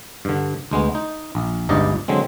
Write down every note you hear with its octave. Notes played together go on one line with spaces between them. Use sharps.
G2 D3
D2 G#3 B3
D#4
A#1
G1 C#2 G2 D#4 D5 D#5
D3 F#3 G#3 C4